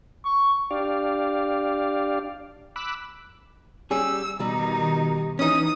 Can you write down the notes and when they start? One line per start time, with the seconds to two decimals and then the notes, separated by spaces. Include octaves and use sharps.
0.24 C#6
0.71 D4 G4 D5 F5
2.76 B5 D6 E6 F#6
3.91 G3 C#4 G#4 E6
4.40 B2 D#3 G3 D#4
5.39 E3 C#4 D#4 D#6